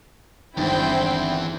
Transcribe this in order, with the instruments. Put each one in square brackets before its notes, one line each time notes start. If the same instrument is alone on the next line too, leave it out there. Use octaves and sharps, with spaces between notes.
[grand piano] G#1 G2 D3 [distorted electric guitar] E2 [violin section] C4 E4 G5